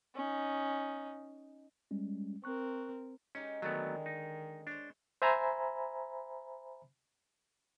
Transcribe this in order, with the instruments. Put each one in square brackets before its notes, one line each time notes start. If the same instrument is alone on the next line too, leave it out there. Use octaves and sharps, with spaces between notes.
[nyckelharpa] C#4 D#4
[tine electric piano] G3 G#3 C#4
[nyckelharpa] C4 A#4 [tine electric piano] C#6 F#6
[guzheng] G#3 D#4 G4 [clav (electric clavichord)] C#4
[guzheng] D3 G#3 [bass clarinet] D#3 [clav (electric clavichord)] F#3 A3 B3
[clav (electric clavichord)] D#4
[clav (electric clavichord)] D4 [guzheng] C5 C#5
[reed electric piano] C5 E5 G#5 A#5 B5